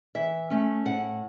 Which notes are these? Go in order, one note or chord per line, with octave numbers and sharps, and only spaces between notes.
E3 E5
A3 C#4
A2 F#5